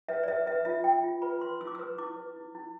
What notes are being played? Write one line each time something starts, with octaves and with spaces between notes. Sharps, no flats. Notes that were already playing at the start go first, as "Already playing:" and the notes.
B4 E5
D5
B4 E5
B4 E5
F4 E5
F4 G5
F4
B4 B5
B4 C6
E4 E6
D6
B4 E6
E4 D6
B4
E4
E4